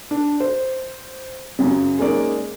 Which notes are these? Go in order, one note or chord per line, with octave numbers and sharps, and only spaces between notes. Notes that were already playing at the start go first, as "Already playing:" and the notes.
D4
C5
F#2 C#3
G#3 A#3 C#4 D#4 D5